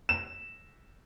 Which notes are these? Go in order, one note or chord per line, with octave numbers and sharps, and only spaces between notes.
E7